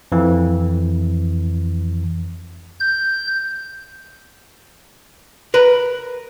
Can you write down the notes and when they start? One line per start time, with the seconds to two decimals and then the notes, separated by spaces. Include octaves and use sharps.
0.12 F2 E3
2.80 G6
5.54 A#4 B4